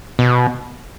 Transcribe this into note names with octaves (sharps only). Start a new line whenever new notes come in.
B2